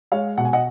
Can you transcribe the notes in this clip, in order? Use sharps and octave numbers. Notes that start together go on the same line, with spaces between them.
G#3 C#5 F5
B2 F#5
G#5
D#5 F#5